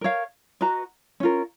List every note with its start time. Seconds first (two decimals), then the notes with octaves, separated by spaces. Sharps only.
0.01 A#4 C#5 F5
0.61 F#4 B4 D#5 A#5
1.20 C#4 F4 A#4